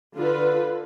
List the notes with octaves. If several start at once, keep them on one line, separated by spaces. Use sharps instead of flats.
D3 F4 B4